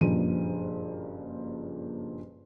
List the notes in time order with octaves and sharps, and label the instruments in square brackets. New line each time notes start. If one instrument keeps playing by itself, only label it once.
[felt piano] F#1 G2 A#2 F3 D#7